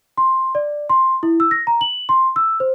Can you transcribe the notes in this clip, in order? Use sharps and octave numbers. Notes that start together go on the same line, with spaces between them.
C6
D5
C6
E4
E6
A#6
A#5
F#7
C6
E6
C5